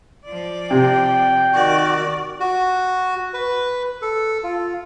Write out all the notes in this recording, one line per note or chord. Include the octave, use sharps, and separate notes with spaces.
F3 D5
C3 G5
D#3 F#4 D5
F#4
B4
A4
F4